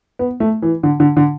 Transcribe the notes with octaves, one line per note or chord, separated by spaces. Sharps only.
B3
A3
E3
D3
D3
D3